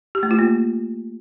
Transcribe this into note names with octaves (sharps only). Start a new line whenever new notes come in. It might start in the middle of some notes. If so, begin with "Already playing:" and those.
G4
A3
F4
A#3